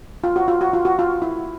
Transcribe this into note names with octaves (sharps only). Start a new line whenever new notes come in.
F4
F#4
F4
F#4
F4
F#4
F4
E4